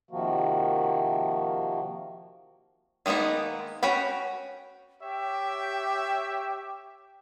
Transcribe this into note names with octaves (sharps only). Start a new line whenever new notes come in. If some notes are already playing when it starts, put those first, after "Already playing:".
C3 D#3 F3 A#3 F#4
D#3 G#3 A#3 B3 D#4
C#4 F#4 G5 B5
G4 C#5 E5 G5